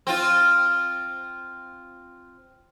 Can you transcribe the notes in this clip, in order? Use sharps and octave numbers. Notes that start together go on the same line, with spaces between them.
C4 F4